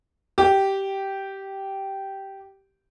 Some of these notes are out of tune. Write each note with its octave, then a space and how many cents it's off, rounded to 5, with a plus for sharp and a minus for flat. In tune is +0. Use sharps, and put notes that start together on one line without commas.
G4 -10